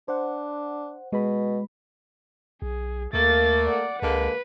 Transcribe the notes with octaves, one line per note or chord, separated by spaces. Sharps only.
D4 C5 F#5
B2 G#3 B5
B1 G#4
D#2 A3 A#3 A6
D5 F#5
C#2 D3 G#3 A#3 B4